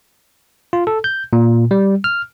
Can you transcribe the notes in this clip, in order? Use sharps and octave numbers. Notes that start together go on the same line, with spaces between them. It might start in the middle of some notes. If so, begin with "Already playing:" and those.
F4
A4
G6
A#2
G3
F6